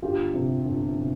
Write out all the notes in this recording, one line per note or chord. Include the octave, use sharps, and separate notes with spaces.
G1 F4 G4
C3
G1
C3